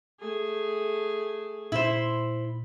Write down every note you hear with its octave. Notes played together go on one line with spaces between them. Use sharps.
A3 G#4
A#2 E4 C5